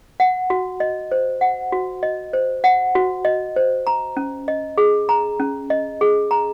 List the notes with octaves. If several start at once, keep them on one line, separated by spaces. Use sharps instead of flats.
F#5
F#4
D#5
C5
F#5
F#4
D#5
C5
F#5
F#4
D#5
C5
A#5
C#4
D#5
G#4
A#5
C#4
D#5
G#4
A#5